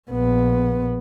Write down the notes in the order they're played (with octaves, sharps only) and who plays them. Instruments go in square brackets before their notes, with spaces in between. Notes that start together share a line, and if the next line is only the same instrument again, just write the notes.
[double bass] A#1 B3